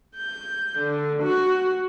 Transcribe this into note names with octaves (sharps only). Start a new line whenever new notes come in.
G6
D3
F#4